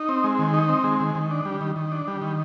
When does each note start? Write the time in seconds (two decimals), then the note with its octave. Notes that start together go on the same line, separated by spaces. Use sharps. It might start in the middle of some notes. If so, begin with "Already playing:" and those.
Already playing: D#4
0.09 C4
0.24 G#3
0.39 D#3
0.54 D#4
0.69 C4
0.84 G#3
1.00 D#3
1.15 D#3
1.31 D4
1.45 G3
1.61 D#3
1.76 D#3
1.92 D4
2.08 G3
2.22 D#3